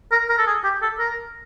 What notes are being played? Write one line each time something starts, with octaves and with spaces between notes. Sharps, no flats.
A#4
A#4
A4
G#4
G4
A4
A#4